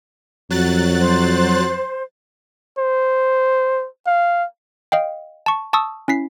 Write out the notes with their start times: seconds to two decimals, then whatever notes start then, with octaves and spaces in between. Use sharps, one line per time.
0.50 F2 F#3 F#6 A6
0.98 C5
2.78 C5
4.07 F5
4.92 D#5 F5 G5
5.46 A5 C#6
5.73 A5 C#6 D#6 E6
6.08 C#4 E4 B6 C7